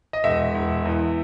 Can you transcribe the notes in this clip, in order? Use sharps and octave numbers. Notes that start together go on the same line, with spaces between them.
D#5
E1 E5
E1
E2